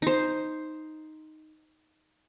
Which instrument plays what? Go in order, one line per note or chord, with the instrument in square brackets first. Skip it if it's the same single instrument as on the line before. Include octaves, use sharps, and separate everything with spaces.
[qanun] D#4 C5